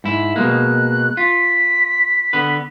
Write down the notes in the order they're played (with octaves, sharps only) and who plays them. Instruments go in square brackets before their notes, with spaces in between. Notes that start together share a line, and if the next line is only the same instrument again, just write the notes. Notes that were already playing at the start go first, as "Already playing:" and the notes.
[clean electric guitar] G#2 E4
[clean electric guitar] B2 G#3 A#3 [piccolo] F#6
[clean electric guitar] F4 [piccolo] B6
[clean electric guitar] D3 B3 B4